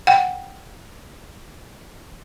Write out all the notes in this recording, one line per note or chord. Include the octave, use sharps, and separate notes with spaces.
F#5 G5